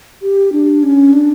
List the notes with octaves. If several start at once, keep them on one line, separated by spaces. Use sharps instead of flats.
G4
D4
C#4
D4